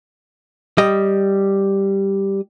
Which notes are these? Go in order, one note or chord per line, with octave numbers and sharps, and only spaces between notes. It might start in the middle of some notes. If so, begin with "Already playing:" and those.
G3 D#5